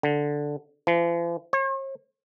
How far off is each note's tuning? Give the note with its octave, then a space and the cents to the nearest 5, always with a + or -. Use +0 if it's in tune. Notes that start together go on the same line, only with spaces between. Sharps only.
D3 +0
F3 -45
C#5 -45